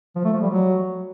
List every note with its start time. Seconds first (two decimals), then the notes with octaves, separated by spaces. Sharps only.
0.16 F3
0.24 A3
0.33 F3
0.42 G3
0.50 F#3